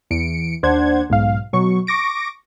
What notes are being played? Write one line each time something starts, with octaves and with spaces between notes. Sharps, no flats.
E2 C#7 D7
D#2 D4 C5 F#5 G#6
B1 G#2 F5
B2 F#3 C#6
C#6 D6 A#6 D7